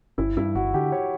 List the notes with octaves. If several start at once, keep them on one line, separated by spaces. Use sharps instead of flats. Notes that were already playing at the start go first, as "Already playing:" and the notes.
G1 E4
G2 E4
G1 F#4
D3 G4
C#5